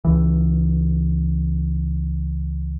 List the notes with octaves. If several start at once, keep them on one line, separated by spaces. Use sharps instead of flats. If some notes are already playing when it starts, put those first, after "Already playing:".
C#2 E3